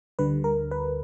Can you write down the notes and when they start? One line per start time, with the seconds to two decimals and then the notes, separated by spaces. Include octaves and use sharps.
0.19 D2 D3 G3 B4
0.44 A#4
0.71 B4